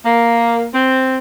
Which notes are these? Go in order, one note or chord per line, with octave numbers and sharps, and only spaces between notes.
A#3
C4